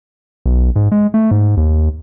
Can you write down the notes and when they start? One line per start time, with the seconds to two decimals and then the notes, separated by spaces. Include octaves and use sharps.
0.46 B1
0.76 G#2
0.92 G#3
1.14 A3
1.31 G#2
1.57 D#2